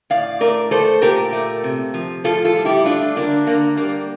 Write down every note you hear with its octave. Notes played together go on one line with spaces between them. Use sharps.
A2 D5 F5
A3 A#4 D5
A3 A4 C5
A#2 G4 A#4
A3
C3
F3
A2 F4 A4
F4 A4
G3
E4 G4
A3 D4 F4
D3 A#3 D4
D3 A#3
G3 A#3